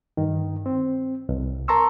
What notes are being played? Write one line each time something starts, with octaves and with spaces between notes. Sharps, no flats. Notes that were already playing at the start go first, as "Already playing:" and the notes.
G2 D#3
C4
C2
A#4 A5 A#5 C6 C#6 E6